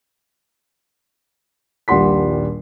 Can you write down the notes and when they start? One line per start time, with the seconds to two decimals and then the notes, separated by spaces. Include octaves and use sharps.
1.88 D#1 A#1 G3 F#5 C6 B6